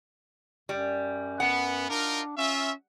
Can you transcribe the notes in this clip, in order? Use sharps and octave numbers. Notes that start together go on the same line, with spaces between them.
F#2 G3
B3 F#5
D4 D#4 F4 A#4
C#4 F4 E5